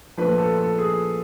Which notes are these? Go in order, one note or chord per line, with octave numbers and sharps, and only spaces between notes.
A#2 F3 A3 D4 B4
A4
A4
G#4